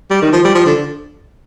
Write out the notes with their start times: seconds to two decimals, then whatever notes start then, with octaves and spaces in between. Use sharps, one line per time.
0.11 G3
0.22 D#3
0.33 F3
0.44 G3
0.55 F3
0.66 D3